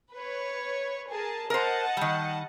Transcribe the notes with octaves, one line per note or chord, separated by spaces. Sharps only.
B4 C#5
G#4 A#4 A5
A#4 C5 D#5 F#5 A5
D#3 G3